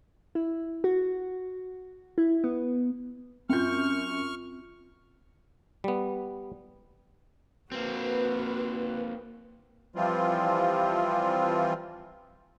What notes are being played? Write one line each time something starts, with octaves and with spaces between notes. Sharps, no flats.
E4
F#4
E4
B3
F#2 C4 F4 C#6 F6 G6
G3 B3
A#3 C4 F#4 B4
E3 F3 G3 C4 F4